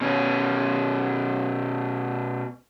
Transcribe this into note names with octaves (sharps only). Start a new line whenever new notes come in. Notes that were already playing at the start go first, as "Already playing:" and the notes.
B2 C#4